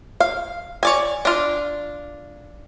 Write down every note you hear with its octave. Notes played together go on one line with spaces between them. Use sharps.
F5
C#5 D5 G#5
D4 F4